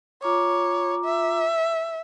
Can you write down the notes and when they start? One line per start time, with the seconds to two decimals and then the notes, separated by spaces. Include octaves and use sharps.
0.22 F4 C#5 A#5 D6
1.05 E5